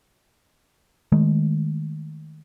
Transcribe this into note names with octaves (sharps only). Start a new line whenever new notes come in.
D#3 G#3 A3